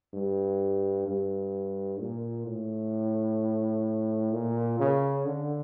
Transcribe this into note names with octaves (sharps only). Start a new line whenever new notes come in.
G2
G2
A#2
A2
A#2
C#3
D3